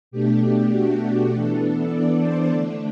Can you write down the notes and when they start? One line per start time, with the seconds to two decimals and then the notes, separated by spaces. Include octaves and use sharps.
0.11 B2 A3 D4 G4
0.71 F#4
1.01 G4
1.30 E3 B3 D4 A4
1.90 D5
2.19 C5
2.50 D3 A3 D4